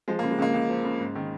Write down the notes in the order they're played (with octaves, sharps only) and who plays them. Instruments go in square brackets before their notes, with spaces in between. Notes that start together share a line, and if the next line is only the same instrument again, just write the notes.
[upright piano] F3 G#3
A#3
C#3
G#3
C#2 A#3
C#2
F3
C#3
G#2
D#3